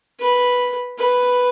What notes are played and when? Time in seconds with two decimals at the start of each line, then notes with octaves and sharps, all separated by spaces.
0.20 B4
0.99 B4